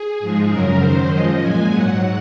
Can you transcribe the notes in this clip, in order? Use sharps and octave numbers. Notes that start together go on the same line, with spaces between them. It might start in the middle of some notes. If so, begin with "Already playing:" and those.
Already playing: G#4
G#2 F3 G#3
F#2 C#3 F#3 A#4
F#2 D#3 F#3 C5
F#2 F3 G#3 D#5
A#2 G#3 G#5
G#2 F#3 F#5